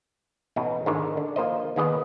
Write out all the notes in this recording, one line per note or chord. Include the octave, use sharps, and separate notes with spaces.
A1 B2 D#4 F#4
G#2 D3 D#3 G#3
D3
F3 A#3 C5 D#5
D#2 D#3 B3 G#4 B4 D#5